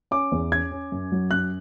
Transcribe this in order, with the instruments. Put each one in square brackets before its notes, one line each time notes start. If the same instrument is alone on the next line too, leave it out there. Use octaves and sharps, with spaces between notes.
[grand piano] C#4 D6
E2
C#4 G#6
C#4
F#2
F#3
F#2 F#6